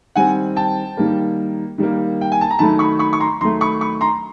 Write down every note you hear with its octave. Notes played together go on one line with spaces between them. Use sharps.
D#3 G3 C4 F#5 G#5
G5 A5
D#3 G3 A#3
D#3 G3 A#3
G5
G#5
A5
A#5
D#3 F#3 A3 A5 B5
B5 C#6
B5 C#6
C#6
A#5 C6
D#3 F#3 A3 A#5 C6
B5 C#6
B5 C#6
A#5 C6